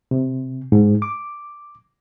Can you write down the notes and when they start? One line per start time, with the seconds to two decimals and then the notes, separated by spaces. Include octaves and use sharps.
0.11 C3
0.72 G#2
1.02 D6